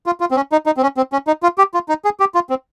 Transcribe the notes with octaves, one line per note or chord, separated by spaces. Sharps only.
F4
F4
C4
C#4
D#4
D#4
C4
C#4
C4
C#4
D#4
F4
G4
F4
D#4
G#4
G4
F4
C4